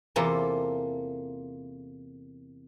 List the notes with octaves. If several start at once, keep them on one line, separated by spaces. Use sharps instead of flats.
E2 C3 A#3 F4 A4